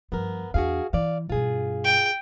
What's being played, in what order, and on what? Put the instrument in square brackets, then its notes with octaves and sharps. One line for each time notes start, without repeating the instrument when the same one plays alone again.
[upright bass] G2 F3 [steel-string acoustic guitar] B3 A#4
[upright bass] E2 D4 [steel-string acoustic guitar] F#4 G#4 F5
[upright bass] E3 [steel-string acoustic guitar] D5 F5
[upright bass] G2 B2 [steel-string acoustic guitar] F4 G#4
[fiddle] G5